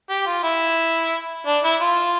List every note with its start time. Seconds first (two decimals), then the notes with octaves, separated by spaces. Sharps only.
0.09 G4
0.26 F4
0.43 E4
1.47 D4
1.64 E4
1.82 F4